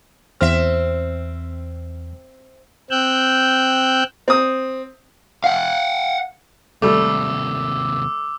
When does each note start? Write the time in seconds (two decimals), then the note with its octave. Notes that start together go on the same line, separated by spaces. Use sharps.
0.41 E2 C4 C5 E5 F6
2.91 C4 G5 E6 F#6 G6
4.28 C4 D#6
5.44 F5 F#5
6.82 D#2 C3 G3 A3 D6 E6